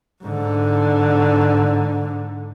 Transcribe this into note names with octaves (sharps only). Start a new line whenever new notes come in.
G#2 D3